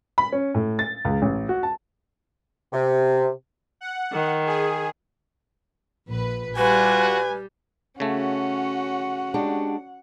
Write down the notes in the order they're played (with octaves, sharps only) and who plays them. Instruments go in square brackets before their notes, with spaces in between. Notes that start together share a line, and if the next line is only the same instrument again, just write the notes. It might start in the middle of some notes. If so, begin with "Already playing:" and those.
[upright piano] B5
C#4
A2
A6
C#2
A1
F#4
A5
[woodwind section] C3
[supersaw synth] F#5
[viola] D#3
[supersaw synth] G#4
[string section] A#1 B4
[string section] G3 [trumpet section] F4 F#4 [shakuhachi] B4 [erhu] G#5
[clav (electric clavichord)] C#3 A3 [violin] C#4 F#4 [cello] F#5
[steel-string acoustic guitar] G#3 D4 G4